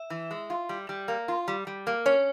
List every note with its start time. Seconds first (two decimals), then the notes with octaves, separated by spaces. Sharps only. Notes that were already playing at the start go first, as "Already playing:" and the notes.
Already playing: E5
0.10 E3
0.31 G#3
0.50 F4
0.69 G3
0.89 G3
1.08 A#3
1.28 F4
1.48 G3
1.67 G3
1.87 A#3
2.06 C#4 C#5